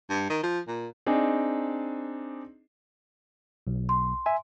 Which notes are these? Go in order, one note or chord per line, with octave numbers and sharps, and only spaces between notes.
G2
D#3
F3
A#2
C4 D4 D#4 G#4
B1
C6
E5 G#5